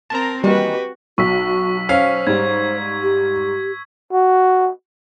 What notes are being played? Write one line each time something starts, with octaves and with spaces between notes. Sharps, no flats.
C4 A#4 A5 A#5
D#3 E3 G3 A#3 F#4 G4 B4
B1 F#4 C#6 E6 B6
C#4 C5 F5
G#2 G3 G#6
G4
F#4